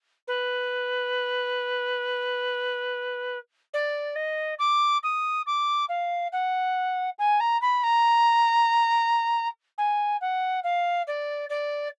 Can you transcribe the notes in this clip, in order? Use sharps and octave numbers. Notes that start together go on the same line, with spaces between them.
B4
D5
D#5
D6
D#6
D6
F5
F#5
G#5
A#5
B5
A#5
G#5
F#5
F5
D5
D5